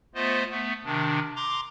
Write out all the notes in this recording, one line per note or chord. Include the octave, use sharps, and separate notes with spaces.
A3 B3 F4 C5 D#5
A3 B3
C3 D#3 D4
A#5 C6 D6